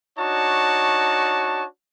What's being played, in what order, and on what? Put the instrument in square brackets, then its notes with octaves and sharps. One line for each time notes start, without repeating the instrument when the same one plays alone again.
[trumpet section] D4 D#4 F#4 C#5 A5